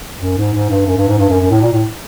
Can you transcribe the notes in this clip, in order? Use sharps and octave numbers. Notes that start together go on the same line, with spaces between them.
F#2
G#2
G#2
G2
F#2
G2
G#2
G2
F#2
F#2
A2
A#2
A2